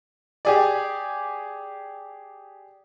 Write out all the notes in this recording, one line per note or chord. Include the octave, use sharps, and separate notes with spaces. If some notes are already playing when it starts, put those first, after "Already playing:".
G4 G#4 D5